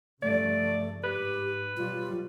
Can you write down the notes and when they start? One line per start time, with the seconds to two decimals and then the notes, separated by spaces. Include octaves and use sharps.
0.22 G2 C#3 F3 A3 D5
1.04 G#2 G4 B4
1.77 B2 F#3 G3 F4